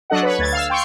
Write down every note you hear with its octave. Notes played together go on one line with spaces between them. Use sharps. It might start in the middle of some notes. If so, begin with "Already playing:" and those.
F#3 D4 A4 D#5 F#5
B4 C#5
D2 G#6 A6
F5 E6
F5 G5 C6 C#6